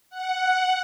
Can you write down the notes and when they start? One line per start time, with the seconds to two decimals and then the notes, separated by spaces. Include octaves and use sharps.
0.10 F#5